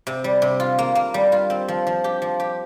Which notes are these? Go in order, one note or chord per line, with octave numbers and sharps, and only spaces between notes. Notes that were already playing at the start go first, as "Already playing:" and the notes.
C3
G3
C3
F4
A#3
A#3
G3
F4
C4
F3
F3
G4
F3
G4